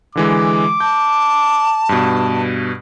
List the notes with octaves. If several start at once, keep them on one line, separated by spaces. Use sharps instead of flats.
D3 E3 G#3 D6
A5 G6
G2 B2